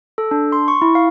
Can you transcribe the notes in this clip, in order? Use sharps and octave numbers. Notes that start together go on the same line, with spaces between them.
A4
D4
C6
C#6
E4
F5